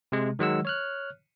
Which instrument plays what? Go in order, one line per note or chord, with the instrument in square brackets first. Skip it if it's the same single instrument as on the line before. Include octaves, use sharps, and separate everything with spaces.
[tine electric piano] C3 G#3
D#3 F#3 G#3 F#5 E6
C#5 F6 F#6